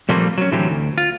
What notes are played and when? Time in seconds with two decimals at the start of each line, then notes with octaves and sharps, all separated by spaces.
0.09 A#2 F3 G3 A3 A#3 C4
0.38 F#3 C#4
0.52 A2 D3 E3 F#3 C4 G4
0.70 D2
0.98 F4